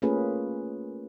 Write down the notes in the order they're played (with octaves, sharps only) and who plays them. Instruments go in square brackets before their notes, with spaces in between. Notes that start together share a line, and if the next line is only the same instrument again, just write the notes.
[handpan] A3 A#3 C#4 F4 G#4 B4